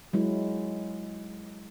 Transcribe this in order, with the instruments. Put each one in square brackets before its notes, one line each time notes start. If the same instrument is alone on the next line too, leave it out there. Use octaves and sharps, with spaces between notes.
[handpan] F#3 G#3 E4